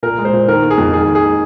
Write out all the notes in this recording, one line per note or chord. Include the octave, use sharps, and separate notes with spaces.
A#2 A#4
G#3
C5
A#2
D#3 A#4
A#3
G#4
F2
D#3 G#4
A#3
G#4